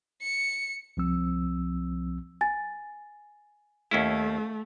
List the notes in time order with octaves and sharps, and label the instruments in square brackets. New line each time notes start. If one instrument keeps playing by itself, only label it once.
[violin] C#7
[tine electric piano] C2 F3 C4 E6
[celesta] G#5 A6
[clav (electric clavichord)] D#2 C#4 E4 [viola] A3